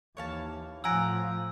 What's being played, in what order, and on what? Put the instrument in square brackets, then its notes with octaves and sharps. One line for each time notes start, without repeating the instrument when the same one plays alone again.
[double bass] D#2 E3 [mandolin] C#5 F5 A5
[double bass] A2 F3 [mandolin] F#5 G#5 A#5 [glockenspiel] E6 D7